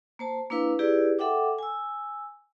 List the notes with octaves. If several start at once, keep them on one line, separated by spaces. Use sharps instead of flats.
A#3 C5 A5
A#3 D4 E4 B4 F5
E4 G4 G#4 B4 D5
A4 E5 F#5 G5 D6
G#5 E6